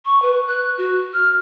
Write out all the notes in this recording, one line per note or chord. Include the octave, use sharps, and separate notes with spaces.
C#6
B4
F#6
F#4
F6